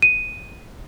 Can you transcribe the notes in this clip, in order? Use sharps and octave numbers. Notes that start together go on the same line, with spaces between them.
D#7